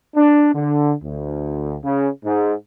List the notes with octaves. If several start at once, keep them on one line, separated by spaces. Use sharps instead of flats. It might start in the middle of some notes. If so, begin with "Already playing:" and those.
D4
D3
D2
C#3
G#2